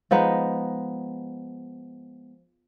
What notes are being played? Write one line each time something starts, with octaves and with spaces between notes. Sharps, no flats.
F3 G#3 B3 D#4